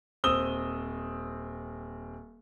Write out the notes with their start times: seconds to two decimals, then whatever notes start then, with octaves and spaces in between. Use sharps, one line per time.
0.24 D#1 C4 D#6 E6 G7